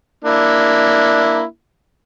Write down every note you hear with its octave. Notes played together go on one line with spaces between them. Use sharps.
A#3 D4 E4